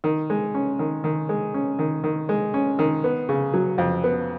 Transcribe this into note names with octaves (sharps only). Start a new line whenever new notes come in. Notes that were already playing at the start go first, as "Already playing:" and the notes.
D#3
G#3
C#4
D#3
D#3
G#3
C#4
D#3
D#3
G#3
C#4
D#3
B3
C#3
F#3
F2
B3